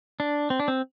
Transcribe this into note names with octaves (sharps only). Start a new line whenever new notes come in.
D4
C4
D4
C4